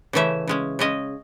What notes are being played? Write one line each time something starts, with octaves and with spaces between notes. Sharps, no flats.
C#3 E3 A3 C#4 E5
C#3 G#3 C#4
C#3 G#3 C#4 D#5